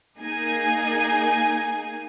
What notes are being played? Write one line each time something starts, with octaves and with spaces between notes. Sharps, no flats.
A#3 D#4 G#4 G#5